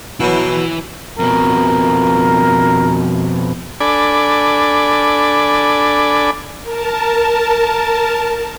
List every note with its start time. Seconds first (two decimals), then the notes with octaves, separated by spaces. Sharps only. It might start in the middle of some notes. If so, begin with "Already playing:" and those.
0.20 B2 E3 F#3 E4 B4
1.19 F2 B2 A#4
3.80 D4 A4 D5 G#5 B5
6.63 A#4 A5